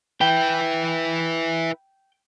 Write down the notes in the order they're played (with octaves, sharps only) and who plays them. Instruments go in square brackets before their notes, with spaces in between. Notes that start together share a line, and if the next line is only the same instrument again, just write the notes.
[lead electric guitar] E4 B4 [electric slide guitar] G5